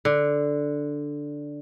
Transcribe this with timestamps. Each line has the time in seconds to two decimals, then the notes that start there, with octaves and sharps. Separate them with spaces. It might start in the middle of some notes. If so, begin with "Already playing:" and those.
0.05 D3